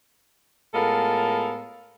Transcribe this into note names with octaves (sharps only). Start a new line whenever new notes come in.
A2 G#3 B3 F4 A4 A#4